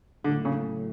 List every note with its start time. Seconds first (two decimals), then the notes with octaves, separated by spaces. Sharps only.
0.24 A2 D3 F#3 A3
0.45 C#3